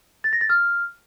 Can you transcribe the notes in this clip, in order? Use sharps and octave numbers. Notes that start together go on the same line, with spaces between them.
A6
A#6
A6
F6